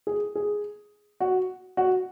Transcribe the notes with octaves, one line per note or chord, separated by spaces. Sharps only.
G#4
G#4
F#4
F#4